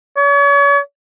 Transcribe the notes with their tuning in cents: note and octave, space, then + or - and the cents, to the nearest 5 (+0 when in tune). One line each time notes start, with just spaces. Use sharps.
C#5 +40